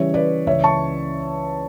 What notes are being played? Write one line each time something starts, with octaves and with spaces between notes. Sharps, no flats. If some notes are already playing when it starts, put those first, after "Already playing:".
Already playing: C#3 E3 G3 C#5 E5
B4 D5
C#2 C#3 E3 C#5 E5
A5 C#6